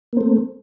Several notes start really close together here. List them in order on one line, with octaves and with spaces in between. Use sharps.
A#3 C4 A3